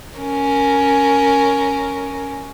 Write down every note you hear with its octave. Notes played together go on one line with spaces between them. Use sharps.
C#4 A#4